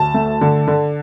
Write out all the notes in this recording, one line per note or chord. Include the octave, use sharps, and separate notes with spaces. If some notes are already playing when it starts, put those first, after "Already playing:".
Already playing: D2 A5
A3
D3
D3